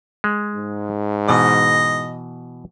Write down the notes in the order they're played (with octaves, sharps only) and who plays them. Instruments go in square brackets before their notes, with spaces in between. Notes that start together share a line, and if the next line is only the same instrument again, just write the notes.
[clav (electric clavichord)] G#3
[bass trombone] G#2
[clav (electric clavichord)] B2 E3 [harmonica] D#5